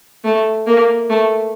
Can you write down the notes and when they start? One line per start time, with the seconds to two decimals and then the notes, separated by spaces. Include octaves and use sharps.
0.24 A3
0.67 A#3
1.10 A3